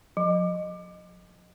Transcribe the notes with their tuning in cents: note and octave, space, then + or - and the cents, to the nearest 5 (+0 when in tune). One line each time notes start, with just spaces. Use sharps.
F3 +45